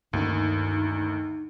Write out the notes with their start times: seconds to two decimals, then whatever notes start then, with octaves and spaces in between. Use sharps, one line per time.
0.13 D2 G2 D#3 A#3 C#4 D#4